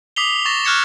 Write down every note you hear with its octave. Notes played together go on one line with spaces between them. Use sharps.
D6 D#6 B6 C7 F7 G7
C#6 A6 A#6 E7
C#6 F6 F#6 G#6 C#7 E7